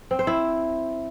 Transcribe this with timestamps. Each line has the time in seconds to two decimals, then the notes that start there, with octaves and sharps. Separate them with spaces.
0.11 C4
0.19 C5
0.27 E4